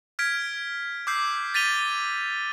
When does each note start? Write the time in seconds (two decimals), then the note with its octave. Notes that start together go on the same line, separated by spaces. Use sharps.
0.19 F6 G#6 B6 D7
1.07 D6 E6 G6 C7
1.54 A6 B6 D#7 F7 G7